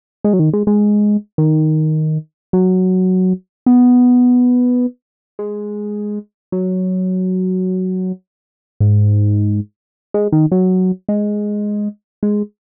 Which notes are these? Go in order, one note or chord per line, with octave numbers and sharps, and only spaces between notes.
G#3
F#3
D#3
G#3
G#3
D#3
F#3
B3
G#3
F#3
G#2
G#3
D#3
F#3
G#3
G#3